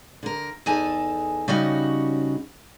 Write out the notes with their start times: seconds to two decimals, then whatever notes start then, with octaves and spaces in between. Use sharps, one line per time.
0.23 D3 A#4
0.66 E2 D#4 G#4 A4 G#5 A5
1.48 C#3 G3 C#4 D#4 F#4